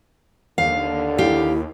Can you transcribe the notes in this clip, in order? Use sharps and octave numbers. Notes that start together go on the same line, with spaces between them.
D#2 D3 F5
E4 G4 F5